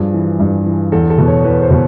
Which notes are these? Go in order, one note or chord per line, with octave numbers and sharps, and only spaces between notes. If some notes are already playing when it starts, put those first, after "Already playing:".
Already playing: G2 F3 G#4
E3
G2
E3
E2 A4
A4
B2
C#5
E2 B4
C5
B2